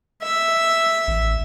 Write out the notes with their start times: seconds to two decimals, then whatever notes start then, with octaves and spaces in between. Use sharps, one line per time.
0.22 E5
1.07 A1